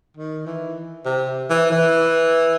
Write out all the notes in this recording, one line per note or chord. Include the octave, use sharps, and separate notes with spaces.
D#3
E3
C3
E3
E3